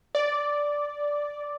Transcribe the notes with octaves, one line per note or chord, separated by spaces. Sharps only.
D5